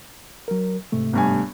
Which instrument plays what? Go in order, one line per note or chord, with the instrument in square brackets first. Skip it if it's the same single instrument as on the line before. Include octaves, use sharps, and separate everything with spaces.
[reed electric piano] F#3 A#4
G#2 C3 A3
[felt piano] G1 G2 G#5